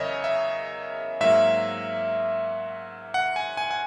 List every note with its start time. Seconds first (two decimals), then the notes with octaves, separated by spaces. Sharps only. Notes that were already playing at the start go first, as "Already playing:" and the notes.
Already playing: E2 C#3 F#3 A#4 C#5 D#5 E5
0.24 E5
1.20 G#2 F#3 A#3 E5
3.14 F#5
3.36 G#5
3.57 G#5
3.71 G#5